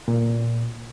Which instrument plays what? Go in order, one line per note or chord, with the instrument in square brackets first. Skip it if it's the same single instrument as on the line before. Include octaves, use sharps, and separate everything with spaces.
[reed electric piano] A#2